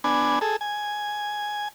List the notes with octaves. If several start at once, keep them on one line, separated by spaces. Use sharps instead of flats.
B3 D4 G#5
G#4 A4
G#5